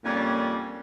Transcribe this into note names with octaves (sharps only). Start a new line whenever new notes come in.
F2 A#2 G3 C#4